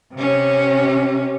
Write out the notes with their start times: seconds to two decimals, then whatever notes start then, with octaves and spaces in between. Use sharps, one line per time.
0.15 C3 C#4